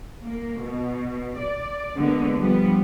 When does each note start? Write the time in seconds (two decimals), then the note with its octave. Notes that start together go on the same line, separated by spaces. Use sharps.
0.24 A#3
0.60 B2
1.38 D5
1.96 D3 G#3 A#3 B3
2.38 G2 F3 G3 B3